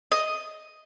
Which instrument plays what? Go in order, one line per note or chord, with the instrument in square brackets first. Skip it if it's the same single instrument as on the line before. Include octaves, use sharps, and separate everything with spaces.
[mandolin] D#5